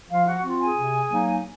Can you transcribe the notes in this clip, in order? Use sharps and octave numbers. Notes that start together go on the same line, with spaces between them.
F3 F4 F5
F#4 F#5
C4 F4
G#4 G#5
C3
F#3 A#3 D#4